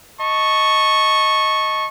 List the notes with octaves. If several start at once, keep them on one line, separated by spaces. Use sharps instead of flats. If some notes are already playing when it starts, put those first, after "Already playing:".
D#5 A5 C#6